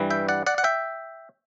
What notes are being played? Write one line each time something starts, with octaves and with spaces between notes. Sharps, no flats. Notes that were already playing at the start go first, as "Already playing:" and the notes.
Already playing: G2 E3 G3
E5 G5
D5 F#5
D5 F#5
F#5
E5 G5